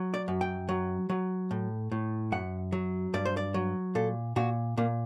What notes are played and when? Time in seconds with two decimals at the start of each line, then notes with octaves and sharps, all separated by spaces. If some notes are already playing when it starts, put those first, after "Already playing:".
Already playing: F#3
0.14 D5
0.28 F#2
0.41 G5
0.69 F#3
1.10 F#3
1.51 A2
1.92 A2
2.32 F#2 F#5
2.72 F#3
3.14 G2 D5
3.25 C5
3.37 D5
3.54 F#3
3.95 A#2 A4
4.36 A#2 F#4
4.77 A#2 A#3